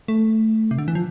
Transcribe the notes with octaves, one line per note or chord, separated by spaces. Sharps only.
A3
C3
D3
E3
F3